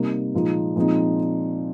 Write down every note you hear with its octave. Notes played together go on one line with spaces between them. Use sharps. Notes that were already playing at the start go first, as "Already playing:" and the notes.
Already playing: C3 G3 A#3 D#4
A#2 F3 G#3 D#4
A#2 F3 G#3 C4 D#4